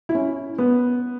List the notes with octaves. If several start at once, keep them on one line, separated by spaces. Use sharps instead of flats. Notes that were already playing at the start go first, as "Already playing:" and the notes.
E4
C#4
B3